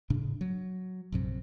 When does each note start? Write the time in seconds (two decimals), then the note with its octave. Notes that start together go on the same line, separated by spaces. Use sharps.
0.10 A2 C#3 D4
0.41 F#3
1.12 A#1 F#2 C3